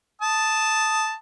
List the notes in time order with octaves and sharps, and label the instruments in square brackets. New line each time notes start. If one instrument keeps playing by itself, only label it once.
[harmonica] A5 D#6